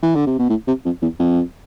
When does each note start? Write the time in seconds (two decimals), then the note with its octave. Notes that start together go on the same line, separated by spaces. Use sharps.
0.03 E3
0.15 D3
0.27 C3
0.39 B2
0.50 A2
0.68 C3
0.85 F2
1.02 E2
1.19 F2